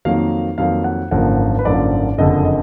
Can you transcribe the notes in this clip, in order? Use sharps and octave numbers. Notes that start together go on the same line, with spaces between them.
F2 D#3 F#3 A#3 F5
F2 D#3 F#3 A#3 F5
F#5
G#1 F#2 D3 F3 A#3 F#5
B4
G#1 F#2 D3 F3 A#3 D5
F#1 F2 D3 D#5
D#5